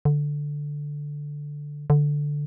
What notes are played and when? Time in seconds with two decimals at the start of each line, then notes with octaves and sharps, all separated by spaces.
0.05 D3
1.90 D3